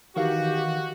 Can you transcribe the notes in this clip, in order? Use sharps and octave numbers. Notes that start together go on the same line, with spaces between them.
D#3 E3 F#4 G4 F5